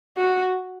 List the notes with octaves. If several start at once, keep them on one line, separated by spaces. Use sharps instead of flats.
F#4